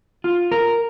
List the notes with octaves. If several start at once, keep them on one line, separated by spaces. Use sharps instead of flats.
F4
A#4